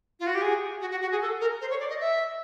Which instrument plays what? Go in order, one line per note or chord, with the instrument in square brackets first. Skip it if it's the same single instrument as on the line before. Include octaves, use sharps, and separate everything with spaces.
[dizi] F4
F#4
G4
G#4
F#4
F#4
F#4
G#4
A4
A#4
C5
C#5
D5
D#5
E5